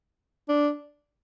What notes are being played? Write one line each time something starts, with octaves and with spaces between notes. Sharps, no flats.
D4